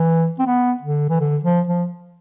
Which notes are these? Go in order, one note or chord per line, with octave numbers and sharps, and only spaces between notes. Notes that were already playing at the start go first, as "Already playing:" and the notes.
Already playing: E3
C4
B3
D3
E3
D3
F3
F3